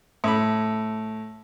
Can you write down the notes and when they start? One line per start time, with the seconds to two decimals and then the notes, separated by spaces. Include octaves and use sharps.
0.24 A2 B5